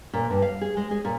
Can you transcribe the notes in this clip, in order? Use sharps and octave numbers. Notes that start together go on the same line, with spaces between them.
A#2
G2
F5
G#4
G#3
G#4
A#2